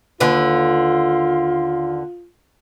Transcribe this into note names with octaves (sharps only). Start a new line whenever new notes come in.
D#2 D3 F4 B4